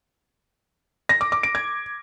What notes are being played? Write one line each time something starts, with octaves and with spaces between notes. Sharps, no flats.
A#6
D6
D6
D7
G#6